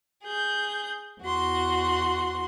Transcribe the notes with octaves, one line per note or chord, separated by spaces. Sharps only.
G#4 G6
E2 F#4 C6